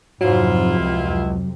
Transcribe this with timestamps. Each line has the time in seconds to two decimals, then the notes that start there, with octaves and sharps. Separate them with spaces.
0.21 F2 G#2 C3 F#3 E4 F4
0.79 C#2